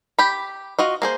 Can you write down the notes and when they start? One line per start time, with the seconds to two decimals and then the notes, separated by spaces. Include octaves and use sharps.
0.19 G4 B5
0.79 F4 F#4 D#5
1.02 A#3 G#4 C5